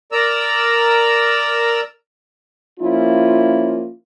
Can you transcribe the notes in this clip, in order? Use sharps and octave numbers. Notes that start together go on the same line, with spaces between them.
A#4 D5 A#5 E6
F3 A#3 C#4 E4 F4